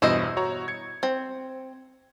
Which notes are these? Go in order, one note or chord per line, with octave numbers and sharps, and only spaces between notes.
E2 G2 B2 E4 C5 D#5
F#4 C#5 A#5
G#6 C#7
C4